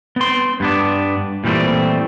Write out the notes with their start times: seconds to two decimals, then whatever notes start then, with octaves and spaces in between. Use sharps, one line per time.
0.16 B3 C6
0.60 G2 B3 D4
1.44 A#2 E3 G3 A3 C4